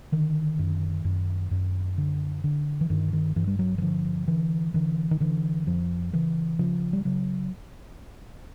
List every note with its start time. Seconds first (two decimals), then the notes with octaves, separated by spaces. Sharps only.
0.12 D3 D#3
0.59 F#2
1.05 F#2
1.51 F#2
1.98 D3
2.44 D3
2.81 E3
2.90 G2 D#3
3.13 D#3
3.36 G2 E3
3.47 G3
3.59 F#3
3.78 E3
3.82 D3 F3
4.28 D3 E3
4.74 D3 E3
5.11 D#3
5.20 D3 E3
5.67 F2 F3
6.13 C#3 E3
6.59 C#3 F3
6.93 G3
7.05 C#3 F#3